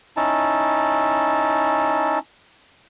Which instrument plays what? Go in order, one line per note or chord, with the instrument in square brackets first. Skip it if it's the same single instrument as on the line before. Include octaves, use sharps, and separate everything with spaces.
[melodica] C#4 D#4 E4 A5